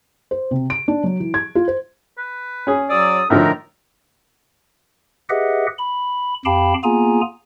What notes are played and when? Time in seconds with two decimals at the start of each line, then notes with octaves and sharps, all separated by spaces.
0.31 C5
0.51 C3
0.70 D7
0.88 D4
1.04 F#3
1.20 E3
1.34 G#6
1.55 F4
1.68 C5
2.18 B4
2.67 C#4 G#4
2.90 F#3 D5 D#6 E6
3.30 A2 D3 F3 D#4 A#4 E5
5.29 G4 G#4 B4 D#5 E5 F#5
5.79 B5
6.45 F2 G4 F5 G5 A5 B5
6.84 A#3 B3 F4 G#4 G#5 A#5